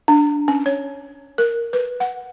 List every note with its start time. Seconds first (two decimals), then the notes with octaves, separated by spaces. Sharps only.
0.08 D4
0.48 C#4
0.66 C#5
1.38 A#4
1.73 B4
2.00 F#5